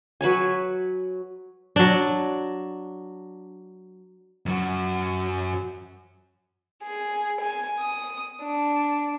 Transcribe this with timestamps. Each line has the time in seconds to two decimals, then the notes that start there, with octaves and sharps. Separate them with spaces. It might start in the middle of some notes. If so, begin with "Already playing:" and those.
0.21 F#3 B4 C#5 G#5
1.76 F#3 D4
4.46 F#2 F#3
6.83 G#4
7.40 G#5
7.80 D#6
8.42 D4